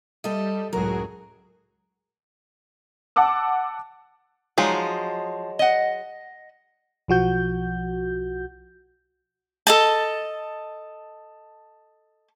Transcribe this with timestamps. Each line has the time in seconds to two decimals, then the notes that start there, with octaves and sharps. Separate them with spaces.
0.24 G3 A4 D#5
0.73 C#2 F#2 A2 F#3 F#4 G#4 A#4
3.16 F#5 A5 D6 E6
4.58 F3 F#3 G#3 D#4 F5
5.59 D#5 F#5
7.08 B1 F3 F#4 G6
9.67 A4 D#5 A5